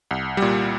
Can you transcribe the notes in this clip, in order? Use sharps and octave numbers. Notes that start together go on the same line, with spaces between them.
C2
A#2 G3